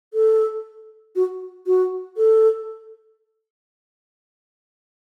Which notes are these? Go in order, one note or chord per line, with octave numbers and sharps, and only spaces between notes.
A4
F#4
F#4
A4